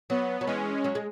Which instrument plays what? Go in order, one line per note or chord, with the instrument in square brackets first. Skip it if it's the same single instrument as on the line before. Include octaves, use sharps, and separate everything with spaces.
[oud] F#3 [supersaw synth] B3
[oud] F#3
[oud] E3 [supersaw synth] G#3 C#4
[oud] F#3
G#3